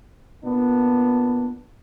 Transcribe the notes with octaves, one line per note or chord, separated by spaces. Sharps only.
A#2 B3 D4